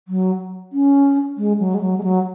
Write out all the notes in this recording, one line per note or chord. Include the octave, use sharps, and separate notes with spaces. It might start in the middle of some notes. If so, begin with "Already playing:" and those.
F#3
C#4
G#3
F#3
G#3
F#3
G#3
F#3